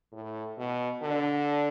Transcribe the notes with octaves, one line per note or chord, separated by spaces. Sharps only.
A2
B2
D3